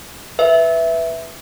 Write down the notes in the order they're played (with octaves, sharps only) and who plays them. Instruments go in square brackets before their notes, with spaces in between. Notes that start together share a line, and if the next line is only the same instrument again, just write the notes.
[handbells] B4 E5